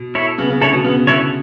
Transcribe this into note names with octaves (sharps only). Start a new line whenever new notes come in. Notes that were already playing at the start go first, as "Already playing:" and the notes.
Already playing: B2
E4 A4 C#5
C#3 B3
C#3
D3 E4 A4 C#5
B2
C#3 B3
D3 E4 A4 C#5